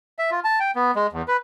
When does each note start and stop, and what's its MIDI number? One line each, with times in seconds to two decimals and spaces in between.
0.19 0.30 76
0.31 0.40 65
0.44 0.59 81
0.60 0.71 79
0.76 0.91 59
0.96 1.07 56
1.13 1.22 40
1.28 1.37 71